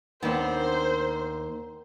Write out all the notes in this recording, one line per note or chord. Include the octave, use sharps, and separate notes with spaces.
D#2 B3 C4 D4 A#4 C5